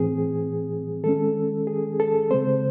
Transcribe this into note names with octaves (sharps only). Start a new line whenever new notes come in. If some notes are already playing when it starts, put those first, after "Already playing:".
Already playing: A2 E3 C4 G#4
D#3 G#3 C#4 A4
G#4
A4
C#3 G#3 C4 C5